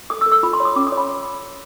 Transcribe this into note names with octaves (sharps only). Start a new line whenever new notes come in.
A4 D#6
E6
A4
E6
F4 B5
C6
C#5
D#6
C#4 D6
D#6
C#5
B5